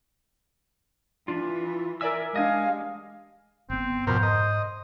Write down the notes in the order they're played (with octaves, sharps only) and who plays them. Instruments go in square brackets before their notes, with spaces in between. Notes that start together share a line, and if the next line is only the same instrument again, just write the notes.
[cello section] E3 [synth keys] D4 [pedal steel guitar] F4
[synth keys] A#4 D5 G#5 [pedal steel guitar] E5 E6
[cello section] G#3 [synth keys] D4 G4 [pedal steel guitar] D#5 G#5 [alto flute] F5
[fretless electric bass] G1 B3 [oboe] C4
[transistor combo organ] F2 B2 A#4 [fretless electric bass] G#2 [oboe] C5
[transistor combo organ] D#5